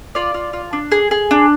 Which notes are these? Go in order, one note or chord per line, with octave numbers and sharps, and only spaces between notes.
F4 D5
F4
F4
D4
G#4
G#4
D4